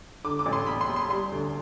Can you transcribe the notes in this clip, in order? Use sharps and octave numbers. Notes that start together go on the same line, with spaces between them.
D3 D6
D6
A1
C6
E2 B5
C6
E2
C6
G3 C6
D2